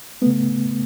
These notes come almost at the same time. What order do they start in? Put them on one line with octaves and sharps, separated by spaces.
A3 B3 C#3